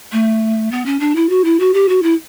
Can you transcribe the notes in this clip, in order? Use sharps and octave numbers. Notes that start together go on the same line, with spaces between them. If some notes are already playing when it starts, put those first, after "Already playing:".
A3
B3
C#4
D4
E4
F#4
E4
F#4
G4
F#4
E4